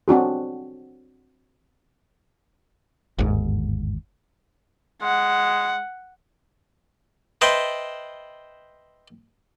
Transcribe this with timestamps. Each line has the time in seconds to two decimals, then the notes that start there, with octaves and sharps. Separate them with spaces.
0.08 C4 D4 F#4 G#4
3.19 G1 D#2 G#2
5.02 G#3 F#5
7.41 B4 C5 D#5 E5 G5 A5